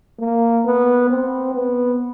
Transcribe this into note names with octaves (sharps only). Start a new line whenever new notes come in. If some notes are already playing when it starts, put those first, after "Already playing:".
A#3
B3
C4
B3